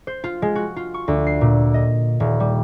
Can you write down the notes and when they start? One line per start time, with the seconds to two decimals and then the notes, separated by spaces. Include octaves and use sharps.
0.07 C5
0.24 F4
0.42 G#3
0.55 F#4
0.76 F4
0.94 C#6
1.08 D2
1.27 C7
1.41 A#2
1.74 D#5
2.20 D#1
2.40 G3